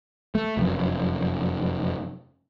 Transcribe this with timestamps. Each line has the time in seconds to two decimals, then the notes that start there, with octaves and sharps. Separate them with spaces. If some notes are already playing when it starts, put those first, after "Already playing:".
0.35 A3
0.57 F1 F#2